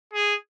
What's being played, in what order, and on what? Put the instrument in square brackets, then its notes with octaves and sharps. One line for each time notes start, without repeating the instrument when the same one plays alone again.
[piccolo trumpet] G#4